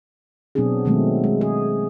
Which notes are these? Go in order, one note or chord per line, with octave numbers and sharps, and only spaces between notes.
B2 F#3 B3 C4 D4 G#4
B2 D#3 F#3 G#3 A3 C4
G#3
G#4